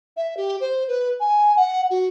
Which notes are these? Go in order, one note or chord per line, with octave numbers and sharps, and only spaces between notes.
E5
G4
C5
B4
G#5
F#5
F#4